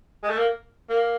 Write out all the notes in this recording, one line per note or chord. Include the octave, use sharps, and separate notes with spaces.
G#3
A3
A#3
A#3